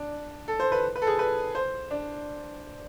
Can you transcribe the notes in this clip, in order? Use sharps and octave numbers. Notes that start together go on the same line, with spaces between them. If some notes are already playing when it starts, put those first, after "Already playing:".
Already playing: D4
A4
C5
B4
B4
A4
G#4
B4
C5
D4